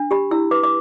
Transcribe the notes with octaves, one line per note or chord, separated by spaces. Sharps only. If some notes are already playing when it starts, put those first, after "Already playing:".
Already playing: D4
G4 B5
E4 E6
B4 D6
D6